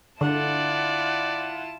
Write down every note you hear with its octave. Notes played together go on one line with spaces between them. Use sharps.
D3 E4 F4 D5 F#5 A5